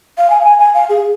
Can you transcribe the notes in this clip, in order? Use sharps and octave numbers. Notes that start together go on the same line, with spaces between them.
F5
G#5
F5
G#5
G#5
F5
G#4